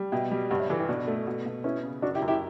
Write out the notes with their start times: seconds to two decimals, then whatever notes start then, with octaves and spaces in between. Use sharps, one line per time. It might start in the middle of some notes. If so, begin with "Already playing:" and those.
Already playing: G3
0.12 B2 E5 G5
0.31 G3
0.50 G2 D5 F#5
0.60 C#5 E5
0.69 E3 F#4 A4
0.79 E4 G4
0.89 B2 D4 F#4
1.07 A3
1.27 B2
1.46 B2
1.64 B3 C#4 E4
1.83 C#3
2.02 F#2 D4 F#4
2.15 E4 G4
2.22 F#2
2.28 E4 G4